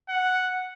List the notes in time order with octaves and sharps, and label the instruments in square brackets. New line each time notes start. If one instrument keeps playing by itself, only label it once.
[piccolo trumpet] F#5